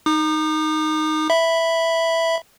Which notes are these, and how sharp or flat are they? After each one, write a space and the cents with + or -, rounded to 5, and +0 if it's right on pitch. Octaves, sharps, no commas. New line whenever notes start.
D#4 +0 D#6 -45
E5 +0 B5 +0